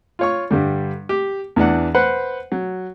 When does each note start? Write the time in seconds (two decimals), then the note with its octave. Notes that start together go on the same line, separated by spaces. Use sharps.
0.19 F4 C#5 C#6
0.51 G2 D3 G3
1.09 G4
1.56 E2 E3 D4 F#5
1.94 B4 C5 F#5
2.52 F#3